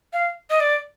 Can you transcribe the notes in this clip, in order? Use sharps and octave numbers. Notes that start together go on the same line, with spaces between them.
F5
D#5
D5